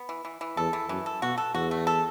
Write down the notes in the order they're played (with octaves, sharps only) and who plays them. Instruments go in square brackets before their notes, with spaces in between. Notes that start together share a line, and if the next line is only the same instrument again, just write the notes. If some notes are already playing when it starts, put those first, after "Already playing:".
Already playing: [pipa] B3
E3
E3
E3
[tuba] E2 [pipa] A4
[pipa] E3
[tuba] F#2 [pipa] E3
[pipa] A4
[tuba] B2 [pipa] F#4
[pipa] A4
[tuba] E2 [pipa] F#4
[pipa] A3
A4